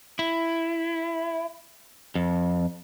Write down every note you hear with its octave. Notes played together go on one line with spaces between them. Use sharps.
E4
F2